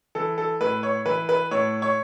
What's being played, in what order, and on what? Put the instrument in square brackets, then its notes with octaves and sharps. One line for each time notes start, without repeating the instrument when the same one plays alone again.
[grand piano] E3 A4
A4
A2 B4
C#5
E3 B4
B4
A2 C#5
C#5